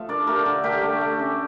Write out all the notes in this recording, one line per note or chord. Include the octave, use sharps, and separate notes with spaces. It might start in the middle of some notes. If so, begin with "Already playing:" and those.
Already playing: F3 A3 F5
D4 A#4 D5
A3 G4 A#4
D3
A3 G4 A#4
A3
A3
C#4